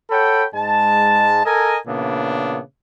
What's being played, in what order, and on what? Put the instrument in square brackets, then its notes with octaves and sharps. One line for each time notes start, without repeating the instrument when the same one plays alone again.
[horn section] A4 C#5 F#5 G5 B5
G#2 G#3 A5
A4 A#4 D#5 G#5
A#2 C#3 E3 B3 D4